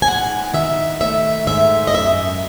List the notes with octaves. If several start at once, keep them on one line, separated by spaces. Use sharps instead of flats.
G#5
G#2 F#5
D#3 E5
A3 E5
G#2 E5
D#5
F#2 E5